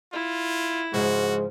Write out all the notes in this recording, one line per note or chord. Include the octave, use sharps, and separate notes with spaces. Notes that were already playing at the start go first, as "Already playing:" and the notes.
E4 F4
G#2 C#3 F3 G#3 F#4